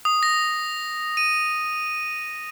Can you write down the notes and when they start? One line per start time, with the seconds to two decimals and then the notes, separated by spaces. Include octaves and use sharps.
0.05 D#6
0.23 A#6
1.17 D#7